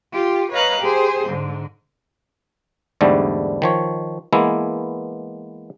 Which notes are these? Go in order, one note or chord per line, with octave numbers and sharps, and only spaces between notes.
F4 G4
B4 C#5 D#5 F5 A#5 F#6
G4 G#4 C5
G#2 D3
E2 G#2 D3 G3 A3
D#3 F3 C#5
E3 G#3 A#3 B3 E4